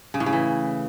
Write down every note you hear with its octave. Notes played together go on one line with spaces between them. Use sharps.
C#3
A2
C#3
E3